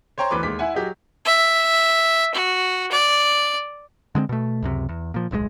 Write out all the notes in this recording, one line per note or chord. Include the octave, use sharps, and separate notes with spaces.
C5 C#5 G5 A#5 C6
D2 E3 B4 D6
D#2 G#3 D6 B6
E4 E5 F#5 G#5
F#3 G4 G#4 D#5
E5
F#4
D5
D3 G#3 A#3 C4
B2 A3
C#2 F#2 C3
E2
A#2 F3
D1 B1 C#3 G#3